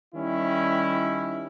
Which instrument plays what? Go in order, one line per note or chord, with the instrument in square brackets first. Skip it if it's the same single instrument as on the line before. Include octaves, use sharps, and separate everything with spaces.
[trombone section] D#3 G3 C#4 E4